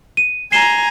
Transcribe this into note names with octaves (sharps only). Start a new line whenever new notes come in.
D#7
G#5 A#5 C7 E7 G7